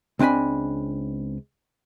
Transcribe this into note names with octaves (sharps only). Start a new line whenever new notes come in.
C#2 C4 D4 G#5 B5